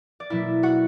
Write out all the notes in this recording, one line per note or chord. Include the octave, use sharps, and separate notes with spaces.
D5
B2 F#3 A#3 E4 E5
F#4 F#5